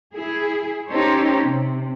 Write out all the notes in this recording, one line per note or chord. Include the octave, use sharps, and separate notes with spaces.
E4 G#4
C#4 D#4 G4 A4 C5 C#5
C3